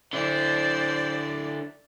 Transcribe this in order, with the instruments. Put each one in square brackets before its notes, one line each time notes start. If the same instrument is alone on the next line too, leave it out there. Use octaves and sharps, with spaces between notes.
[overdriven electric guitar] D3 E4 [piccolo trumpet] C5 [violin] D5